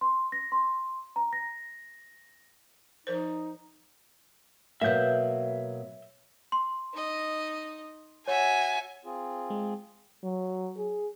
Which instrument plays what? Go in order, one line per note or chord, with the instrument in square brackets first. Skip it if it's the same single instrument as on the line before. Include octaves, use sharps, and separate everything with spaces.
[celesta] C6
A#6
C6
A#5
A#6
[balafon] F3 A#4 C5 [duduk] D#4
[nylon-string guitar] B2 F#3 A#3 [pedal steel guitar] E5 G6
[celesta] C6
[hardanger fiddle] D#4 D#5
[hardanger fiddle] F#4 E5 [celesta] C#5 [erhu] G#5
[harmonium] C4 F4 G#4
[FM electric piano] G#3
[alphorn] F#3
G#4